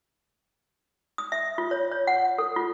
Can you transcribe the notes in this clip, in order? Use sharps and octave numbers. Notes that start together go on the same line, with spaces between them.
D#6
E5
F4
C#5
C#5
F#5
A4
F4